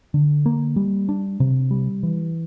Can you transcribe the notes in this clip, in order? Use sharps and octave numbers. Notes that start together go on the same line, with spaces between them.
D3
A#3
G3
D4
C3
G3
E3